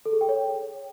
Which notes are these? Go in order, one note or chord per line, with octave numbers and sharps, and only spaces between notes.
A4
G#4
G5
C#5